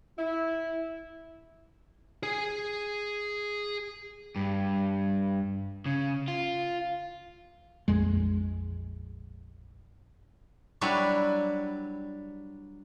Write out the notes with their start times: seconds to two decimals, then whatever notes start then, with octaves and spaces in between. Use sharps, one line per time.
0.18 E4
2.23 G#4 G#5
4.36 G2
5.86 C#3
6.28 F4
7.88 A#1 F2 G#3
10.81 F#3 G3 D4 E4 F#4 B4